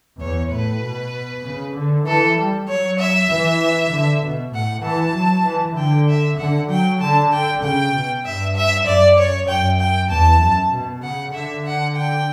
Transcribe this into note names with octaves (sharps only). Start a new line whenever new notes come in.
E2 C#5
A2 B4
B2
C#3
D3
E3 A4
G3
F#3 C#5
E5
E3
D3
B2
A2 F#5
E3 A5
F#3
E3
D3 G5
E5
D3 F#5
F#3 G5
D3 A5
G5
C#3 G5
B2
G2 E5
E5
F#2 D5
C#5
F#2 G5
G5
E2 A5
F#2
B2
C#3 F#5
D3 E5
F#5
G5